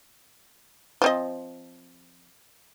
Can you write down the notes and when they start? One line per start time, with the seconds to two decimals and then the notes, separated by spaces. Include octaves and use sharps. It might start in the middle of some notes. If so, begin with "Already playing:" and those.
1.02 F3 C4 D#5